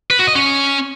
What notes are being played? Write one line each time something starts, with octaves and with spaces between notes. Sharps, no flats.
B4
F#4
D#5
C#4